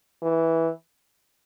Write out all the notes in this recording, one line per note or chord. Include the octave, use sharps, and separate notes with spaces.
E3